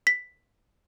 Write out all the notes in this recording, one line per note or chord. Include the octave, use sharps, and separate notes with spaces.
B6